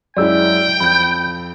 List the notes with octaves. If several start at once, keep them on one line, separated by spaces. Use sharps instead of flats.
F#2 G#3 E4 D5 G5 E6
F2 B5 G6